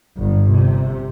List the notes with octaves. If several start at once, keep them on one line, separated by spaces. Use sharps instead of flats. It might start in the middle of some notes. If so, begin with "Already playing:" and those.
G1 G2
C3